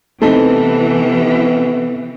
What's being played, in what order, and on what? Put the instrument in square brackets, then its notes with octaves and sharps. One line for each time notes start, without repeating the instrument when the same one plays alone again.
[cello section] C3 E3 [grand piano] A3 C4 D#4 [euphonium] B3 [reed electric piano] A4 A5